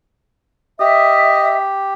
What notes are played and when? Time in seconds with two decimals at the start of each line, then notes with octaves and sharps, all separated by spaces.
0.80 G4 D#5 E5